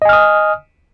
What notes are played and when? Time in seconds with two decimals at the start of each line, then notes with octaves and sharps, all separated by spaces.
0.02 D#5
0.05 G#5
0.09 F6
0.13 D#6